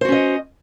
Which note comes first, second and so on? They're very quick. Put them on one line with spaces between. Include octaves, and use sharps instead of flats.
C5 F#4 C#4 D#5